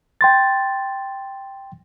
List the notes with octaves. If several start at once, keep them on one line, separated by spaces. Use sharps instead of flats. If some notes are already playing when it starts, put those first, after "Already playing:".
G5 C6 A6